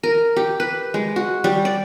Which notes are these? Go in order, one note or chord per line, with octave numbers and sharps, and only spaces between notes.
A#4
G4
B4
G#3
F#4
G3
D5